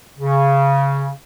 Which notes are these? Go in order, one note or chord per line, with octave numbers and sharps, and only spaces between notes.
C#3